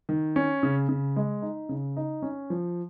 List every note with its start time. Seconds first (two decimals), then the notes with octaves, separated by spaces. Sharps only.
0.09 D#3
0.36 C#4
0.63 C#3
0.89 C#3
1.16 G#3
1.42 D#4
1.69 C#3
1.97 D#4
2.22 C#4
2.50 F3